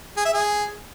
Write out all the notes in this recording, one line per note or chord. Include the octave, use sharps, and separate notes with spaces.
G#4
E5
G#4